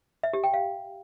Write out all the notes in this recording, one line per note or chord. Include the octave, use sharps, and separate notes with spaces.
E5
G4
G5
F5